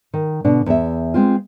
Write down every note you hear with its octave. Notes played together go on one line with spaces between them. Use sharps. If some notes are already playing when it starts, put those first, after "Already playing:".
D#3
B2 D3 D4
E2 E5
G#3 C4 F4